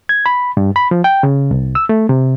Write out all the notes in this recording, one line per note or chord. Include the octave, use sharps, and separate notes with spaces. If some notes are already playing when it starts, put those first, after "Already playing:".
G#6
B5
G2
B5
F3
G5
C#3
C2
E6
A3
C3